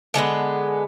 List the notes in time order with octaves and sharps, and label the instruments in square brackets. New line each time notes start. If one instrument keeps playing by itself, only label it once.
[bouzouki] D3 G#3 A3 B3